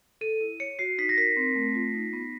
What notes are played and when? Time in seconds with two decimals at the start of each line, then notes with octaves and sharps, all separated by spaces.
0.21 A4 D#7
0.41 E4
0.60 C#5 C#7
0.79 F#4 C7
0.98 D#4 B6
1.09 A#6
1.17 A#4 B6
1.37 C4
1.55 A3
1.75 F4
1.94 D#4
2.13 B3